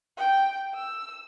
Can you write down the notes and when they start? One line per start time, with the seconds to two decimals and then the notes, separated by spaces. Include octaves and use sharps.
0.17 G5
0.75 E6